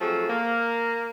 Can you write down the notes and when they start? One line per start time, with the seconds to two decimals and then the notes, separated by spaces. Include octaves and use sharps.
0.01 F3 F#3 A3 C4 G#4
0.29 A#3